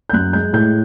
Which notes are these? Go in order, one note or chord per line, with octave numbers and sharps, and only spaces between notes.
G6
F#2 F#6
G#3 G6
A2 G6